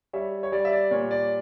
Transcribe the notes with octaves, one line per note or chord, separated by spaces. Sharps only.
G3 C#5 E5
C#5
G3 D5
E5
D5
A#2 C#5
D5